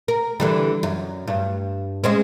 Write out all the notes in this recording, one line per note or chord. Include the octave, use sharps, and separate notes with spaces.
A#4
D3 E3 G3
F#2
G2
G#3 C4 C#4